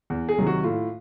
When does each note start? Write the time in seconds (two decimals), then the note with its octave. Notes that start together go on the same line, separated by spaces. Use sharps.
0.10 E2
0.29 G#4
0.38 C3 D#3 F#3
0.47 F#4
0.64 A2 F4